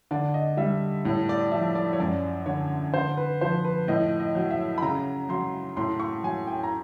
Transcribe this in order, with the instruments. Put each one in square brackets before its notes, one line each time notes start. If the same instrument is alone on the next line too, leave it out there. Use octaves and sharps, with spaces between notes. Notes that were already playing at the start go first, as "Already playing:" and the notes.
[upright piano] D3 D5
D#5
G3 E5
A2 C#5
D5
F3 E5
D5
C#5
F#2 D5
D3 C#5
D3 C5
B4
F3 C5
B4
A2 D#5
D#5
F#3
E5
B5
C#3 A#5
F#3 C6
A2 C6
C#6
F#3 G#5
G5
A#5